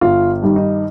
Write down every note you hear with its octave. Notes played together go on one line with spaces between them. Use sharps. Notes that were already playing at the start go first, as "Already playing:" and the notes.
G1 F4
G2 D#3 G3
D#4